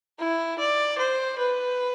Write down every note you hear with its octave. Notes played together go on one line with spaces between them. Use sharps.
E4
D5
C5
B4